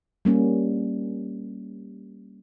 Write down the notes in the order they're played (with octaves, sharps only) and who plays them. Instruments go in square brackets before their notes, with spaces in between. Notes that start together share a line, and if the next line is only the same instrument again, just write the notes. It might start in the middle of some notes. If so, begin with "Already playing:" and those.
[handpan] G3 A#3 C#4